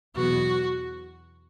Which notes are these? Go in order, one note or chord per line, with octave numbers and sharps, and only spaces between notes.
E2 B2 F#3 B3 F#4